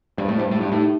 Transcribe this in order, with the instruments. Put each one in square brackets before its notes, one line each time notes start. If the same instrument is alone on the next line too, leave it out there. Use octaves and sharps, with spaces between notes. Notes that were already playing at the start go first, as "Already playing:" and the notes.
[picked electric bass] G2 [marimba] C5
[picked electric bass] A2
[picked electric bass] G2 [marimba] C5
[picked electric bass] A2 [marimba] G4
[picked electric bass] G2
[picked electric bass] A2 [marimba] D#4